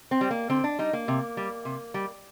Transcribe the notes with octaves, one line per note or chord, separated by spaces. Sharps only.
C4
G3
A#3
D3 C4
D4
G3 D#4
A#3
C3
G3
C3
G3